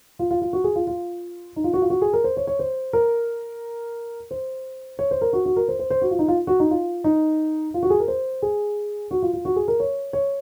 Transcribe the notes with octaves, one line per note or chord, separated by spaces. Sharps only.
F4
F4
F4
F#4
G#4
F4
F4
D#4
F4
F#4
F4
F#4
G#4
A#4
C5
C#5
C#5
C5
A#4
C5
C#5
C5
A#4
F#4
F#4
A#4
C5
C5
C5
F#4
F4
D#4
F4
F#4
D#4
F4
D#4
F4
F#4
G#4
A#4
C5
G#4
F#4
F4
F4
F#4
G#4
A#4
C#5
C#5